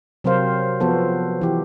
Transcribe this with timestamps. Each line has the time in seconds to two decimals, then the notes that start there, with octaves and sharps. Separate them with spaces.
0.24 C3 F#3 C4 A#4 C5 F5
0.80 F3 B3 F#4 A4 C5
1.41 E3 G4